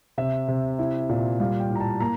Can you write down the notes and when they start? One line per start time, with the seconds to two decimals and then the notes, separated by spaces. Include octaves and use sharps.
0.18 C3 E5
0.48 C3
0.79 E4
1.09 A#2
1.40 G3 F5
1.60 G5
1.70 A2
1.76 A#5
1.80 A5
2.01 A#3 A#5